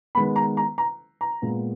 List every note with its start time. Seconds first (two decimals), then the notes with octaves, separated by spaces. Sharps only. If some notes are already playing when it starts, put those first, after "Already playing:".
0.15 D#3 G#3 B3 B5
0.36 A#5
0.57 A#5
0.78 A#5
1.21 A#5
1.42 A#2 G#3 B3